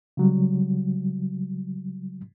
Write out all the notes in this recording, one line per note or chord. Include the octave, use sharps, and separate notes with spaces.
C#3 F#3 G3